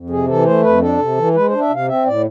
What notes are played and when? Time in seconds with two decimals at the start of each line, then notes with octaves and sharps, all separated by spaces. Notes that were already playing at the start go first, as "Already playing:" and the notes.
Already playing: F2
0.10 C3 G#4
0.27 E3 A4
0.45 A3 C5
0.63 F2 B4
0.81 D4 A4
0.99 C3
1.17 E3
1.34 G#3 B4
1.48 D4 C5
1.61 E5
1.70 C3 F5
1.88 C4 E5
2.05 A2 D5